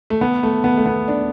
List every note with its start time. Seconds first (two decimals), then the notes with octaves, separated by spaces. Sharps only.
0.10 A3
0.21 B3
0.43 A3
0.64 B3
0.77 A3
0.86 B3
1.08 D4